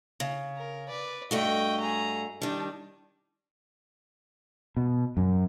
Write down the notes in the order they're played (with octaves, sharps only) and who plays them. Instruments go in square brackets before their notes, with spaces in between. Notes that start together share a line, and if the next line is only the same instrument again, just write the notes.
[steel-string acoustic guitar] C#3
[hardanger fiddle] A#4
B4 D5
[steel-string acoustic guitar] G2 A3 F#4 [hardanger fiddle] D#5 G5
[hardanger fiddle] G#4 A#5
[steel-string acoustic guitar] D#3 G3 [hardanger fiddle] D4
[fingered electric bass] B2
F#2